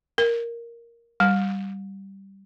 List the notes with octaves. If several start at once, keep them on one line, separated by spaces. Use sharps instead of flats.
A#4
G3